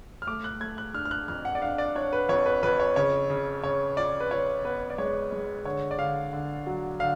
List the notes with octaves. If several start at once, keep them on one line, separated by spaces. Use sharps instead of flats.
F6
A3 D6
F#6
A3 G#6
F#6
D4 F6
F6
F#6
F2 F6
F#5
D5
D4 F5
D5
D4 C#5
B4
F2 C#5
B4
F2 B4
C#5
C#3 C#5
C#3
C#3 C#5
F4 D5
B4
F4 C#5
B3 B4
D5
G#3 C#5
G#3
D3 C#5
D5
D3 F5
D3
F#3
D3 F5